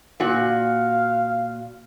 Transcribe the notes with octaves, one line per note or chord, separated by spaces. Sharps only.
A#2 F#4 F5